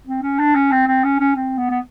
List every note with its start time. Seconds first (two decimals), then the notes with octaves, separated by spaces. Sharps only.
0.07 C4
0.22 C#4
0.39 D4
0.55 C#4
0.71 C4
0.87 C4
1.04 C#4
1.20 C#4
1.35 C4
1.58 B3
1.70 B3